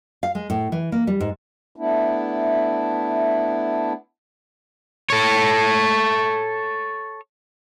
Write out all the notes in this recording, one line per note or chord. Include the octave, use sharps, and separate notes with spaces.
F5
G#3
A2
E3
A#3
G3
G#2
A3 B3 D4 E4
A4 C#5